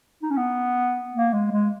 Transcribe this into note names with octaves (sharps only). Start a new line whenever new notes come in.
D#4
C#4
B3
A#3
G#3
G#3